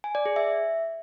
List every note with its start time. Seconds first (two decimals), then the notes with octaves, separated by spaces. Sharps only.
0.04 G#5
0.15 D5
0.26 G#4
0.36 E5